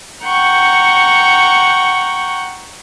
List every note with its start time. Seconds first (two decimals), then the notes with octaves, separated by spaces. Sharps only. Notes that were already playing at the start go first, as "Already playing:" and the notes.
0.24 F#5 G5 A#5 C#6